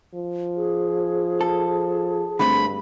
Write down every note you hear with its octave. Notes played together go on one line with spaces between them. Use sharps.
F3
G#4
A4
G2 D3 A3 C4 B5